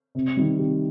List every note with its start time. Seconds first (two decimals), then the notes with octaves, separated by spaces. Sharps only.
0.15 C3
0.37 D#3 G3
0.59 C3 G4